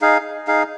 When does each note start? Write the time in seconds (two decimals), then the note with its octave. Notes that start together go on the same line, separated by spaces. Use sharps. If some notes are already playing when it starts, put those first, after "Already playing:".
0.01 D#4 G#4 F5
0.48 D#4 G#4 F5